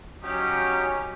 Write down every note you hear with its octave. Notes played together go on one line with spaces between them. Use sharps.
F#3 C#4 D#4 G4